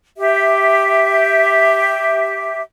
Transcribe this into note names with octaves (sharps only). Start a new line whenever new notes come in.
G4 E5